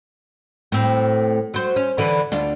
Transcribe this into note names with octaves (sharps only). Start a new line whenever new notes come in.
A2 C4
F#3 C5
C#4
D3 E3 B4
D2 D4 F4